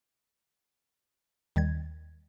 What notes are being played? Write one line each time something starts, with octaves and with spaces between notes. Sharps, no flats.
D#2 D#3 G3 G#6